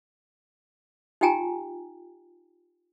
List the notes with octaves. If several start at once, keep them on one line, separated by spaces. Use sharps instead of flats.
D#4 F4 G4 G5 G#5 A#5